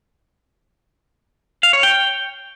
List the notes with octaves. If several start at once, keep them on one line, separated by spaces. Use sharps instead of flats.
F5
C#5
G5